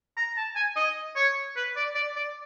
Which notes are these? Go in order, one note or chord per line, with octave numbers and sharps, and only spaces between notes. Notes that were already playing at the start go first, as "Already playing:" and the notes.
A#5
A5
G#5
D#5
C#5
B4
D5
D5
D5